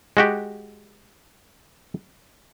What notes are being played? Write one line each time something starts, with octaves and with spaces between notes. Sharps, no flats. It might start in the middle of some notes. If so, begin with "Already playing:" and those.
G#3 F#4 G4